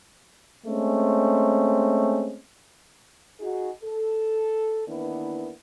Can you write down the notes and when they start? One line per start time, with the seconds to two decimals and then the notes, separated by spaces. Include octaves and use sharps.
0.66 G#3 A3 C4 C#4
3.40 D#4 F#4 G#4
3.83 A4
4.87 D#3 E3 A#3 B3 D4 E4